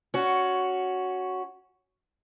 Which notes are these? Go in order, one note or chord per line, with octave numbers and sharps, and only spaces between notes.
C#4 F#4